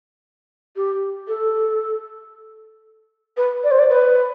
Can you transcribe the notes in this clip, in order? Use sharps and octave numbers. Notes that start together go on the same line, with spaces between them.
G4
A4
B4
D5
C5
D5
B4